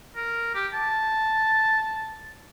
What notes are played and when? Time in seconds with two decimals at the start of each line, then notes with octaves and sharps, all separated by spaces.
0.16 A#4
0.55 G4
0.74 A5